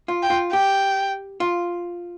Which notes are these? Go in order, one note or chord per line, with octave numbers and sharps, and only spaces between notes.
F4
G5
F4
G4 G5
F4